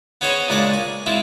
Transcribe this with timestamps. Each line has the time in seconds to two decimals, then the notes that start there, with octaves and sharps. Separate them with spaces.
0.21 B3 C#4 G#4 C5 C#5 D#5
0.48 C#2 A#2 G#3 D4 D#5 D6
0.73 G#5
1.06 G#3 C4 E4 F4